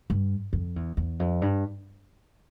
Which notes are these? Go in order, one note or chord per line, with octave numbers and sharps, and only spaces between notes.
G2
F2
E2
E2
F2
G2